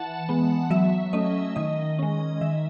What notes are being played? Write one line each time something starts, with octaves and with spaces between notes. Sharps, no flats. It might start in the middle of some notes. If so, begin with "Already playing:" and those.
Already playing: E3 F#5 A5
G#3 B3
F#3 E5
A3 C#4 D#5
D#3 D#5
G#3 C#4
D#3 E5